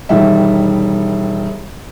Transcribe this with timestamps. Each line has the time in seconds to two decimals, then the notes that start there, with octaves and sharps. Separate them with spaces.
0.09 E1 D#3 G3 E5